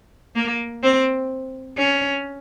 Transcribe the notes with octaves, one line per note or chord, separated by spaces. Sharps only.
A#3
C4
C#4